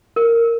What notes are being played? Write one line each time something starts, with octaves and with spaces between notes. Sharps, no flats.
A#4